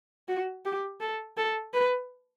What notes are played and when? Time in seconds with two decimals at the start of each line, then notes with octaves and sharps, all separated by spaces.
0.28 F#4
0.65 G4
1.01 A4
1.37 A4
1.73 B4